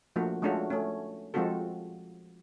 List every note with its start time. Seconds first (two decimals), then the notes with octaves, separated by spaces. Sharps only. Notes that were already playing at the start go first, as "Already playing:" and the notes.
0.16 F3 A3 A#3 D4 F#4
0.42 G#3 A3 C#4 D4 F4 F#4
0.70 A3 C#4
1.34 F3 G#3 C4 F4 F#4 A4